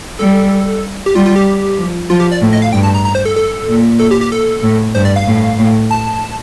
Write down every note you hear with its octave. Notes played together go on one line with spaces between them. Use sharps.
G3 A4
G4
G3 F4
F4
G4
F3
F3 F4
G4
D5
A2
D#5
F5
G2 G5
A5
A#5
A#5
C5
A4
A4
A#2
A4
G4
G4
A4
A2
G2 C5
D5
F5
A2
A2
A5